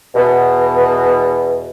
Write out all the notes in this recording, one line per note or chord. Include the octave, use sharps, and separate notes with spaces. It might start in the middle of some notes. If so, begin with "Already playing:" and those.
E2 B2